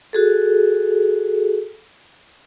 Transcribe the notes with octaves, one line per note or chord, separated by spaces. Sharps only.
F#4 G#4 A4